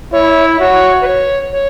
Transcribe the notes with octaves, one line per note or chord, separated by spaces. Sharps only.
E4 C#5
F#4 C#5
B4
C#5
C#5